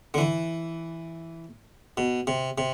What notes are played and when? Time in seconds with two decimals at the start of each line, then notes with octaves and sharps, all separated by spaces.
0.14 D3
0.18 E3
1.97 B2
2.27 C3
2.58 C3